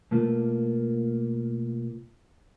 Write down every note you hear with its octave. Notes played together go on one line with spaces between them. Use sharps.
B2 A3 A#3 F4